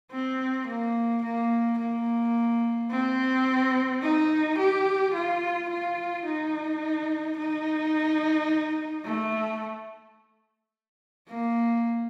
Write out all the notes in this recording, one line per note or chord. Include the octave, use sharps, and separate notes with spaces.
C4
A#3
A#3
A#3
C4
D#4
G4
F4
F4
D#4
D#4
A3
A#3